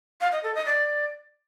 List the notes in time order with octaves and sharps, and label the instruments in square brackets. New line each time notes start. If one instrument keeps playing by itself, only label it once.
[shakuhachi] F5
D#5
A4
D#5
D5